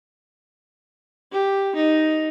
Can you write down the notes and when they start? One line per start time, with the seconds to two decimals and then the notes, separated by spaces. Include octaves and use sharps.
1.32 G4
1.75 D#4